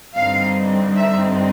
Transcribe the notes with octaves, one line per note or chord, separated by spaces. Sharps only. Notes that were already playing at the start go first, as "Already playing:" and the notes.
G2 D3 G3 C4 D#4 F5
E5